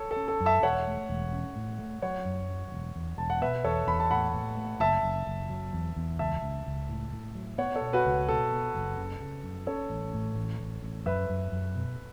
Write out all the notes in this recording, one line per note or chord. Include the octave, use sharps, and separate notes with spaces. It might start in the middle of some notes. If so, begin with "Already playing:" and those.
Already playing: A4 C#5
A4
C#4
A4
F#2
E5 A5
E1 C#5 F#5
A3
E1
C#4
A2
A3
F#3 C#5 F#5
F#2
F#3
E1
E2
E1 A5
F#5
B2 B4 E5
E2 A4 C#5
E2 B5
A5
A2 F#5 B5
A2
A3
F#1 E5 A5
F#1
F#1
F#3
E2
E2
C#2 E5 A5
C#2
C#2
A2
A2
F#3
B3 C#5 F#5
A4 C#5
B2
F#4 B4
C#2
B2 A4
B3
F#1
C#3
C#3
F#2
C#4 A4 C#5
A1
A2
A1
A1
A1
F#2 B4 E5
F#2
F#2
B2